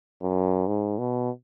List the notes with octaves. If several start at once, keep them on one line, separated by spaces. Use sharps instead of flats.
F#2
G#2
B2